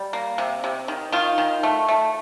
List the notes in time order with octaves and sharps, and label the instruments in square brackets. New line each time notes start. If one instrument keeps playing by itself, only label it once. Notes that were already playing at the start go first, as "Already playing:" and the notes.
Already playing: [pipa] G3
A#3
C3
C3
D#3
D#3 F4
D#3
A3
A3